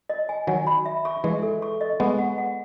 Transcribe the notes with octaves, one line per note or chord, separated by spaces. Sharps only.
D#5
G#5
D#3 F#3 G#5
B5
E5
C#6
E3 G#3 E5
A4
C#6
D#5
G#3 B3 C#6
F#5
F#5